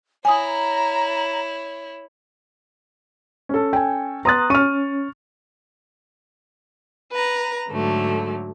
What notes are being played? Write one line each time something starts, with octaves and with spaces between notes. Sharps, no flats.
E4 C#5 G#5 A#5 D#6
C#4 A4
G5 G#5
B3 A#5 C6 D#6 F#6 A6
C#4 C#6 F6 D#7
B4 A#5
G#2 D3 F#3 A3